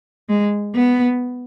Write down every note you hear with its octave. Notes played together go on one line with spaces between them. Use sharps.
G#3
B3